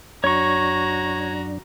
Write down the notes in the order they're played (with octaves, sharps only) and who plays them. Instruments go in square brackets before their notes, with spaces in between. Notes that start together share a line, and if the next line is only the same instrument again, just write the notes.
[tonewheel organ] F#2 D4 [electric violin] F#4 A#5 [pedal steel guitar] C#5 C#6